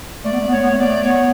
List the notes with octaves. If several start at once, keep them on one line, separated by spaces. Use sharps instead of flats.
A3 D5
B3
A3
B3
A3 C#5
B3
A3
B3 D5
A3
B3 C#5